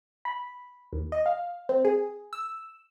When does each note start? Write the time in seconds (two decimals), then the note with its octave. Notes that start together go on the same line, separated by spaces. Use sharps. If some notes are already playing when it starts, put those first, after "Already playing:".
0.25 B5
0.93 D#2
1.12 D#5
1.26 F5
1.69 C4
1.85 G#4
2.33 E6